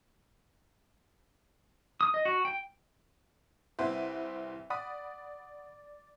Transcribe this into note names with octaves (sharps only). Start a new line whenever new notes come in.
D#6
D#5
F#4
G5
C2 C4 E4 B4 C5 F#5
D5 F#5 B5 D#6